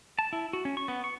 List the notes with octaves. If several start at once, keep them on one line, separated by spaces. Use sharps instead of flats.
A5
E4
F#4
C#4
C#6
B3
C#6